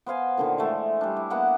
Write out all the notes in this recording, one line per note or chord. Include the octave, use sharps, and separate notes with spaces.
B3 C5 F5 G#5
A#2 D3 D#3
E3 G#3 A3
G3 D4
E4
A#3 B3 F#5